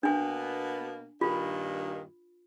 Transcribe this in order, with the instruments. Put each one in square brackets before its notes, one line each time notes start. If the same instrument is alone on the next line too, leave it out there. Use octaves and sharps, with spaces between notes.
[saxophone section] B2 A#3 B3 [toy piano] D4 G#5
[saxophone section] G2 A#2 D#3 [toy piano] F4